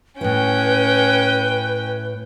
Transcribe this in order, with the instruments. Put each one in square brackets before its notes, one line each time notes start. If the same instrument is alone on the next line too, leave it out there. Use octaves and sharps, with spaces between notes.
[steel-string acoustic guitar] A2 E4 [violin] C#4 G5 [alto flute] B4